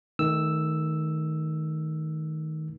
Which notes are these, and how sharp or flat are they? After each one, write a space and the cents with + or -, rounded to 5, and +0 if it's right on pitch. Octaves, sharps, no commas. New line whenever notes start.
D#3 +10 A3 -15 E6 +0